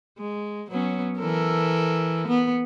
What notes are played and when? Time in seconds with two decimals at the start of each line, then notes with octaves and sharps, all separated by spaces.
0.19 G#3
0.71 F#3 B3 C#4
1.19 E3 A4 A#4
2.28 B3